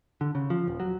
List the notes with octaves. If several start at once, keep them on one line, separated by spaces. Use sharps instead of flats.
D3
C#3
F3
D#1
F#3